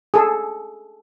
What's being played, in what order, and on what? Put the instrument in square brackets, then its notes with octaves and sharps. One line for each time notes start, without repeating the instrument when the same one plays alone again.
[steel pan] G#4 A4